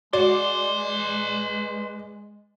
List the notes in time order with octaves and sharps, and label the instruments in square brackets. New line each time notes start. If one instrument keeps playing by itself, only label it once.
[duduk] G#3 [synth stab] F#4 [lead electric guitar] B4 C6 [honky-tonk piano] D5